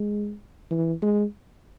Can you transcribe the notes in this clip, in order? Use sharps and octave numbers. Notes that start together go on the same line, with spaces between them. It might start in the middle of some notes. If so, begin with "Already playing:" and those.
Already playing: G#3
E3
G#3